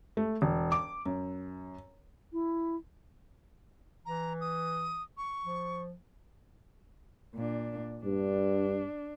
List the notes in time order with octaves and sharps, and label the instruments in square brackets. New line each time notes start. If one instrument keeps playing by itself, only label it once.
[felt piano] A3
E1
D6
F#2
[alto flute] E4
[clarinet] E3 [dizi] A#5
[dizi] D#6
C#6
[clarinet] F3
[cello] A#2 D4
[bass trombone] G2 [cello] D4